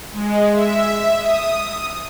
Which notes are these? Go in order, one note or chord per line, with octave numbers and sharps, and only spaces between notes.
G#3
E5
D#6